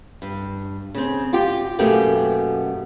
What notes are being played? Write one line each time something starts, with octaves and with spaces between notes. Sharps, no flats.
G2
C#3 C4
F4 G4
F#2 B2 A3 A#3 G4